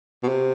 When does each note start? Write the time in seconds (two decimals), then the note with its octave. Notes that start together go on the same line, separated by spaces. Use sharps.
0.23 B2
0.28 C3